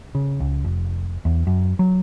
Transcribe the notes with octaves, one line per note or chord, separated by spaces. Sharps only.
C#3
C#2
F1
E2
F#2
F#3